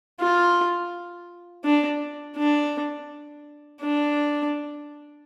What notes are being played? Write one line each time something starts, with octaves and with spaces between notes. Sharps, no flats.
F4
D4
D4
D4